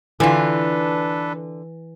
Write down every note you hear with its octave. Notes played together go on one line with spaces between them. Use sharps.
D3 E3 D4 F4 A4 B4